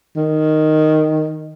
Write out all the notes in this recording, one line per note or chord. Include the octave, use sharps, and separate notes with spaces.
D#3